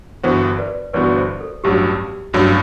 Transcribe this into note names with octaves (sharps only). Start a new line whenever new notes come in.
G1 G2 E3 B3 F#4 C5
B4 D5
G1 G2 E3 B3 F#4 B4 D5
C5
A4
A1 G2 F#3 G4
A1 G2 F#3 F#4